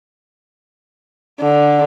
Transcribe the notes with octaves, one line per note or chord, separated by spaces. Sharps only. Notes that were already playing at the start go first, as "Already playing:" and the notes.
D3